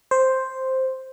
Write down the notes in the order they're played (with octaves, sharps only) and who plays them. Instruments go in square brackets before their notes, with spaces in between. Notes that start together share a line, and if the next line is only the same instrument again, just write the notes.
[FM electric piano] C5